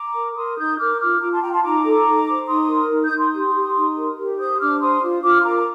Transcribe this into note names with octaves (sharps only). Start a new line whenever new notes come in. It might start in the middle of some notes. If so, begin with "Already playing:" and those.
Already playing: A#5 D6
A#4
A#4 C6 D#6
D#4 D#6 G6
A#4 D6 F6
F4 D6 F6
F4 A#5 D6
A5 C6
F4 G5 A#5
A5 C6
D#4 A#5 D6
A4
D#4
C5
D#4 C6 D#6
A#4
D#4
D#6 G6
D#4
C6 D#6
G4
G4
D#4
A#4
G4
C5 D#6 G6
D4 D6 F6
C5 C6 D#6
F4
F4 D6 F6
C6
A#4 A#5 D6
A#5